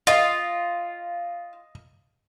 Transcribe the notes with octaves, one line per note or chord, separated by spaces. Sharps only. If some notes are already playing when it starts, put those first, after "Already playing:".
F4 D#5